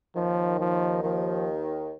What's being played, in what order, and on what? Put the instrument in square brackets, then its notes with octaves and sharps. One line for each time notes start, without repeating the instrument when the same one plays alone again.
[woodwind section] D#2 D#3 [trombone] F3
[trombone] F3
[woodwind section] D#2 D#3 [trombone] F3